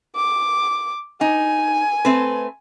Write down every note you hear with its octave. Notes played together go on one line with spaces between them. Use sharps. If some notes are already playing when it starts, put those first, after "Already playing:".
D6
D#4 G#5
A3 C4 B4